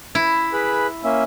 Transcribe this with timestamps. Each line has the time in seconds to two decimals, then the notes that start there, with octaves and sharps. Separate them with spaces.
0.15 E4
0.53 G#4 B4 B5
1.04 A#3 C#4 E5